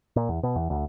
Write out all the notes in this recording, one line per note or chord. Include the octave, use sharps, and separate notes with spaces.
A#2
E2
B2
E2
D2